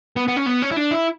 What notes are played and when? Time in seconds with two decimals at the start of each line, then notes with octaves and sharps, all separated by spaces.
0.16 B3
0.28 B3
0.36 C#4
0.46 B3
0.62 C#4
0.71 E4
0.76 D4
0.91 E4